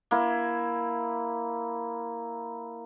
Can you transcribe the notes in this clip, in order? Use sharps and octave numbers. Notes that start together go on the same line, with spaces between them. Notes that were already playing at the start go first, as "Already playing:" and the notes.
A#3 E4